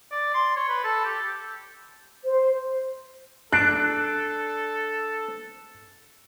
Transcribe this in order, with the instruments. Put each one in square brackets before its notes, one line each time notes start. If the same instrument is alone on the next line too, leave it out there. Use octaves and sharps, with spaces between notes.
[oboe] D5
C6
C#5
B4
A4
G4
[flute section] C5
[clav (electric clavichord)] D4 [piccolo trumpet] A4 [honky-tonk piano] F#6